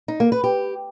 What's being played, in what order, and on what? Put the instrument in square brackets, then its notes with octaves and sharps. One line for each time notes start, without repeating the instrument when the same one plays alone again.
[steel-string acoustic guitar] D#4
A#3
B4
G4